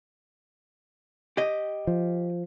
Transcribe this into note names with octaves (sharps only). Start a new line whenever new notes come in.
G4 D#5
F3